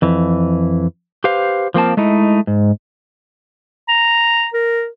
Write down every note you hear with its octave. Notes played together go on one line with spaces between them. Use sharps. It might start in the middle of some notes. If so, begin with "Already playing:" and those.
F2 E3
G4 B4 C5 F5
F3 A#3 C4 A5
G#3 A3 D#4 E4
G#2
A#5
A#4